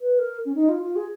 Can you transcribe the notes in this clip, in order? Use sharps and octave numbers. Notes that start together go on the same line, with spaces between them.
B4
A#4
C#4
D#4
F4
F4
G#4